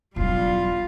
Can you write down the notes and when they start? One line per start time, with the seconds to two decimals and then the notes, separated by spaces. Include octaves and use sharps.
0.16 E1 F#3 G3 F4